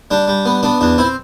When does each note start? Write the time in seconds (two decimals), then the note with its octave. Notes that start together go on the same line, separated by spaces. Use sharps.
0.11 G3 D4
0.27 G3
0.45 B3
0.63 B3 D4
0.81 E2 D4
0.98 C4 E4